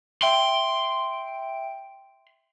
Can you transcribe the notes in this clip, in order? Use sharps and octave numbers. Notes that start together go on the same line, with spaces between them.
E5 G5 C6 D7